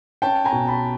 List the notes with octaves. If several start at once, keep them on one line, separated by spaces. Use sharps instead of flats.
C#4 G5 A5
G#5 A#5
B2
A5 B5